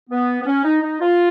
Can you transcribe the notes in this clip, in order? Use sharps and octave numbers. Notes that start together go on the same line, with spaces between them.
B3
B3
C#4
D#4
D#4
F4